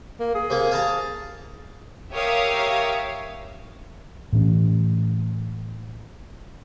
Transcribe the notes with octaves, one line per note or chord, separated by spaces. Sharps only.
A#3
G#4
C3 A#3
F5 A5 A#5
G4 A#4 C#5 E5 F5 D#6
A2 E3 C#4